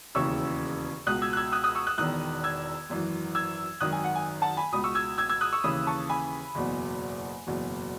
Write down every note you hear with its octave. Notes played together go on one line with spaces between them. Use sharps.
E1 D#2 C#3 E3 C#6 E6
C#2 B2 D#6 F#6
E6 G#6
F#6
E6 G#6
D#6 F#6
D#6 F#6
C#6 E6
D#6 F#6
E1 E2 D#3 D#6 F#6
E6 G#6
G#1 F#2 E3
E6 G#6
G#1 F#2 D#3 D#6 F#6
G#5
F#5
G#5
F#5 A5
G#5 B5
C#2 B2 B5 D#6
C#6 E6
E6 G#6
E6 G#6
E6 G#6
D#6 F#6
C#6 E6
D#2 C#3 E3 B5 D#6
A5 C#6
G#5 B5
F#1 E2 B2
F#1 E2 B2